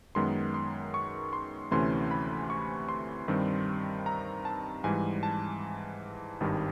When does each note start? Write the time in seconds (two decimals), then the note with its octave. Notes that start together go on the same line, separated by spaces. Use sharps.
0.15 F#2 D#3 G#3 B3 C6
0.54 C6
0.94 C#6
1.33 C6
1.71 D2 C3 E3 A3 C#4 C6
2.11 B5
2.50 C#6
2.89 C6
3.28 G2 D#3 G3 C4
4.06 A#5
4.45 A5
4.84 G#2 E3 G3 G#5
5.23 A5
6.40 G#1 G2 D#3 G3